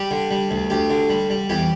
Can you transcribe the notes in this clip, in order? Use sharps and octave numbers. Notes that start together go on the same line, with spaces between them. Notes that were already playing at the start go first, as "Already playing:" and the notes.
Already playing: G3 G4
D3
G3
D2
D2 G4
D3
G3
G3
E2 G4